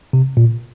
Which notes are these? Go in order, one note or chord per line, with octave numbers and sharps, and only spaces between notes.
C3
A#2